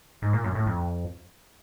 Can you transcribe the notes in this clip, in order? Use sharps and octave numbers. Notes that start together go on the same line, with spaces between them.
G#2
A#2
F#2
A2
F2